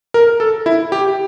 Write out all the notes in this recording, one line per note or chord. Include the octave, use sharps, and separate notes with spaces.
A#4
A4
E4
G4